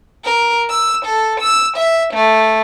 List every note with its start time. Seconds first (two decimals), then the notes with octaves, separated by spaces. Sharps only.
0.24 A#4
0.69 E6
1.06 A4
1.41 E6
1.77 E5
2.13 A3